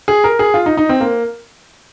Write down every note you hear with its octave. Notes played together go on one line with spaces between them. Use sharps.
G#4
A#4
G#4
F4
D#4
D#4
C4
A#3